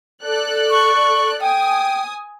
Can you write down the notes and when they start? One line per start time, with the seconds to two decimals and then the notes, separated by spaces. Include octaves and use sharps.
0.23 A4 D5 F#6
0.71 C#6
1.41 G5 G#5 D#6